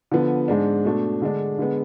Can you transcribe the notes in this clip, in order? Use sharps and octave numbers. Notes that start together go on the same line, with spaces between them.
D3 F3 B3
G#2 G#3 D4
B2 A3 D4
D3 G#3 D4
D3 G#3 B3